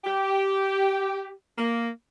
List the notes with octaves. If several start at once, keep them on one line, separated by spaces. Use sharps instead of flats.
G4
A#3